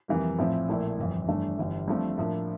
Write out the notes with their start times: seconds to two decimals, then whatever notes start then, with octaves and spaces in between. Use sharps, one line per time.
0.08 F2 C3 E3 G3 A#3
0.39 A#1 A2 F3 C4 E4
0.68 A#1 A#2 A3 E4
0.98 G1 F2 E3
1.28 G1 G2 E3 A3 D4
1.58 G1 G2 E3 G3
1.88 G2 F3 A3 C4
2.18 A2 F3 A#3 D4